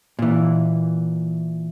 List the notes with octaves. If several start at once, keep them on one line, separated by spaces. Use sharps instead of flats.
A#2 E3